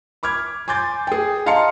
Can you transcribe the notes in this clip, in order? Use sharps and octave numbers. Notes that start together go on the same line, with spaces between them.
B5 D6 F6 G#6
G#5 C6 D6 G6 A6
G#4 G5
D#5 F5 A5 A#5 C6 C#7